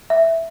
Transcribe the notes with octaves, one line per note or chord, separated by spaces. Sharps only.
E5